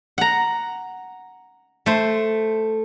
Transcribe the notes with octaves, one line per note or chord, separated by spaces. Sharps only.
F#5 A#5
A3 C5